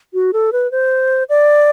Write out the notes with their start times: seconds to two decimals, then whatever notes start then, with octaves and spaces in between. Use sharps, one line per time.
0.14 F#4
0.33 A4
0.53 B4
0.72 C5
1.29 D5